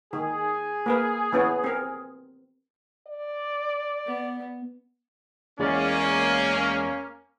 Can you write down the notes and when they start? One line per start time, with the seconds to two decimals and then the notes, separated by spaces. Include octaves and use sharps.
0.13 D#3 G#4
0.86 A#3 A#4 B4
1.33 E3 B3 C#4
1.64 C4 A#4
3.07 D5
4.06 B3
5.59 E2 G#3 A#3 C#4 D5